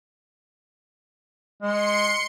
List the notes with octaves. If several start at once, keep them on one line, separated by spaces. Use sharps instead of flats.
G#3 C6 C#7